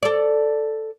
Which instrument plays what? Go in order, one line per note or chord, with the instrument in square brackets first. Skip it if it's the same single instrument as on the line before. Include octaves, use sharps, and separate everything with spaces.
[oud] A4 D5